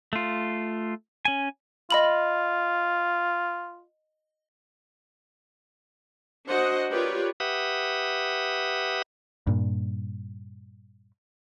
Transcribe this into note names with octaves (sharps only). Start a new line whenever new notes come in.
A3 F4
C#4 G#5
F4 D#5 B5 F#7
D4 F#4 C5 D#5 F#5
F4 G4 A#4 B4 C#5 D5
G4 B4 E5 F#5 D#6
G2 A#2